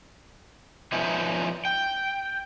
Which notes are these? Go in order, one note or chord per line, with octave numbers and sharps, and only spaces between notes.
F3 B3 C#4 D#4 E4
G5